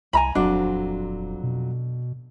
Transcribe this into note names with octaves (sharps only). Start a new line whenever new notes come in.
C2 G#5 A#5 B5
D#1 F2 F#3 C4 D4
B2